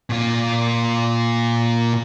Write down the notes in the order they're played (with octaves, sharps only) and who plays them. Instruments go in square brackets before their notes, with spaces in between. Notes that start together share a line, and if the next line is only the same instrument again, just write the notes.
[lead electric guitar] A#2 F4